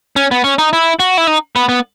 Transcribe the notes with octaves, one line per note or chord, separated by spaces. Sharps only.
C#4
B3
C#4
D#4
E4
F#4
E4
D#4
B3
B3